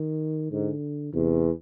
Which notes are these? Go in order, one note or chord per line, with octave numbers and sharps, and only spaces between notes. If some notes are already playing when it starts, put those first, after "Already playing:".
Already playing: D#3
G#2 D3
E2 C3